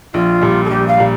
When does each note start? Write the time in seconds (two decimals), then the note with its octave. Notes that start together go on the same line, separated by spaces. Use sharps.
0.13 A#1 F4
0.41 A#2 G3
0.65 A4
0.69 A#1 G4
0.88 F5
0.97 A#2 G3